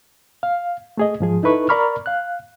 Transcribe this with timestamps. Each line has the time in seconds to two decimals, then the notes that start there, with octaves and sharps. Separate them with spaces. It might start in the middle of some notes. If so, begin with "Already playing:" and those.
0.43 F5
0.97 A3 G#4 D#5
1.20 G#2 F3 G#4
1.43 D#4 E4 A4 B4 C#6
1.69 A#4 D5 A#5 B5 C#6 F6
2.06 F5 F#6